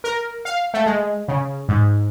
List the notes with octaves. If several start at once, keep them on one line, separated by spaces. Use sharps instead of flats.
A#4
F5
A3
G#3
C#3
G#2